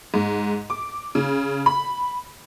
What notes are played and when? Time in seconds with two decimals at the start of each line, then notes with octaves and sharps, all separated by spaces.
0.14 G#2
0.70 D6
1.15 C#3
1.66 B5